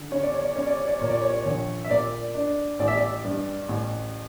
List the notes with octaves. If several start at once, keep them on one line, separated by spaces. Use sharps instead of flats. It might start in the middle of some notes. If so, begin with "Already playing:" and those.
Already playing: D3
C#4 C#5
D5
C#5
D5
C#4 C#5
D5
C#5
D5
A#2 C#5
D5
C#5
D5
A#1 C#5
E5
A#2 D5
D4
A1 D5
E5
D5
G2
A1